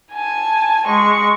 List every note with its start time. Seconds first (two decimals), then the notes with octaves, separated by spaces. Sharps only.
0.13 G#5 A5
0.88 G#3 C#6